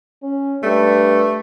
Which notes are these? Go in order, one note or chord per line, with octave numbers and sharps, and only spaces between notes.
C#4
G2 A3